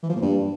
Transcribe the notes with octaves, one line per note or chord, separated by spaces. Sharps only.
E3
F3
A#2
G2